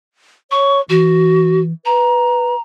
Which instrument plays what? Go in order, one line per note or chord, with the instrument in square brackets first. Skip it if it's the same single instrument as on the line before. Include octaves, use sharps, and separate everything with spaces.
[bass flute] C#5 [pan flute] C#6
[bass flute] E3 [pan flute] F#4
[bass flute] B4 [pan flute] A#5